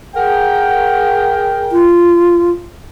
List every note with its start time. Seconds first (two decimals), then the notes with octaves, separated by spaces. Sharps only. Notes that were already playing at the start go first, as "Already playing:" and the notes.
0.16 G#4 A#4 F#5 G5
1.72 F4